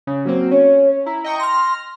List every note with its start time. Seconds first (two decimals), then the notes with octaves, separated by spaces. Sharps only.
0.07 C#3
0.25 F#3 A#3 C4
0.51 C#4 C#5
1.06 E4 A#5
1.24 D#5 G5 C#6
1.39 C6 F6 A#6